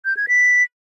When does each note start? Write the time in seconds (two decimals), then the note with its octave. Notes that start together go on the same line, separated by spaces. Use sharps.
0.05 G6
0.17 G#6
0.28 B6